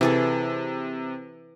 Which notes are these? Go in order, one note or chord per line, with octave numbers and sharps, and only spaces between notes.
C3 E3 G#4 A4